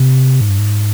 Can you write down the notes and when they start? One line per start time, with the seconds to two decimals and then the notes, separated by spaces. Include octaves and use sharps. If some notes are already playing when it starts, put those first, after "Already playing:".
Already playing: C3
0.41 G#2
0.49 G2
0.58 G#2